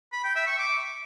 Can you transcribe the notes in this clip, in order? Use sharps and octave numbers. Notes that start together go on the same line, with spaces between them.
B5
G5
E5
C#6
D6